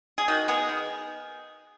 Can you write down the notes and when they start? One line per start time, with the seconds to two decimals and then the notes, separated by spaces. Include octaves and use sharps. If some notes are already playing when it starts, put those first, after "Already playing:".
0.18 G#4
0.28 D#3 F#4
0.48 G#3 B3 G#4
0.69 D#3